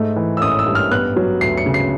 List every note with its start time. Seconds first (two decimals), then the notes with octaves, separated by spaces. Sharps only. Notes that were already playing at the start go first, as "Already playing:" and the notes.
Already playing: G#2 A3
0.16 E3
0.37 E6
0.42 A1 D#6
0.59 E6
0.67 G2
0.75 F6
0.91 B3 F#6
1.17 F#3
1.41 D2 C7
1.58 C#7
1.66 C#3
1.74 C7